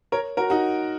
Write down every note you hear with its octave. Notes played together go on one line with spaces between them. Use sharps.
A#4 C#5
F#4 A#4
D#4 F#4